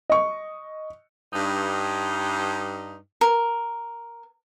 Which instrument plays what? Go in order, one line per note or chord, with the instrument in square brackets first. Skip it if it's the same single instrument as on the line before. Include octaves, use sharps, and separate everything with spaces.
[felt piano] D#5 C#6
[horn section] G2 D#4
[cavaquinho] A#4